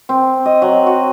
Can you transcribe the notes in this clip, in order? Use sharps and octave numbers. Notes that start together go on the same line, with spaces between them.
C4
D#5
F#3
F#4